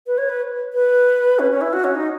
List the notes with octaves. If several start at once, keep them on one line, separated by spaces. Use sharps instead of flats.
B4
C#5
B4
B4
C#4
C#4
E4
F#4
C#4
D#4